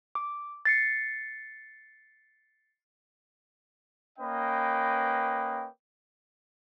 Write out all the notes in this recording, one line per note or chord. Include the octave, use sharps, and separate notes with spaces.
D6
A6 C7 C#7
A#3 C#4 B4 D#5 G5